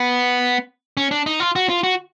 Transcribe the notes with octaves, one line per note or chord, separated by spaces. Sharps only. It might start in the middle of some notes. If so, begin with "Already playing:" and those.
Already playing: B3
C#4
D4
D#4
F4
F#4
F4
F#4